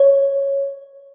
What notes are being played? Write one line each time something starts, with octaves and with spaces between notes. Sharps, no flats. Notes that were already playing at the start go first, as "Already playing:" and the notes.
Already playing: C#5